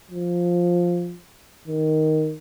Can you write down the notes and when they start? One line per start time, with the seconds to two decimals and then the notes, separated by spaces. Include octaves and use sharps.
0.11 F3
1.68 D#3